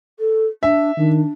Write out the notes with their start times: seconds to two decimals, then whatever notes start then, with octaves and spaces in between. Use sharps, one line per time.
0.19 A4
0.63 D4 E5
0.97 D#3 D4